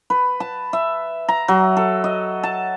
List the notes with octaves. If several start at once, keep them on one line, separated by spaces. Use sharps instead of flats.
B4
A5
E5
A#5
F#3
A4
D#5
A5